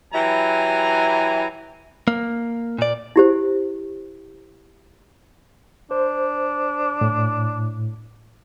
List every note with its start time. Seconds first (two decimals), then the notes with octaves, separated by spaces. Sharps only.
0.13 E3 F#3 E4 G4 G#5 A#5
2.08 A#3
2.78 A#2 D5
3.16 E4 G4 C5
5.91 D4 C5
7.01 A2